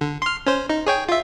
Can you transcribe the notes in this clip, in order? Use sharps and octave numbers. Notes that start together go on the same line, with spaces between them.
D3
C6 F6
C#4 C5
D#4
G#4 C#5 G5
F4 E5